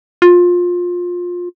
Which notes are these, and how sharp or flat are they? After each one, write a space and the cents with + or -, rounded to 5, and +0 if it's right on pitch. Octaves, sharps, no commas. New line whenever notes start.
F4 +20